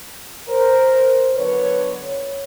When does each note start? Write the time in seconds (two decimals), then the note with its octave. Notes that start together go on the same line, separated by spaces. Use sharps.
0.49 A#4 C5
1.35 D3 F#3 B3 B4 C#5